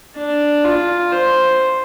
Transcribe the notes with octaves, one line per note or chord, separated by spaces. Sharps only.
D4
F4
C5